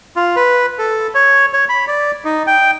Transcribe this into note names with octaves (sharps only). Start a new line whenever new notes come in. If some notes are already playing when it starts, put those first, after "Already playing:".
F4
B4
A4
C#5
C#5
B5
D5
D#4
G5